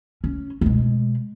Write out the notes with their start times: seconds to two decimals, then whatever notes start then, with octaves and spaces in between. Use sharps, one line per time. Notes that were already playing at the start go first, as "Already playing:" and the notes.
0.24 C#4
0.61 B2 G#3